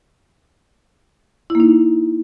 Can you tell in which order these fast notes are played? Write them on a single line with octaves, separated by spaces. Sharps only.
E4 A#3 D#4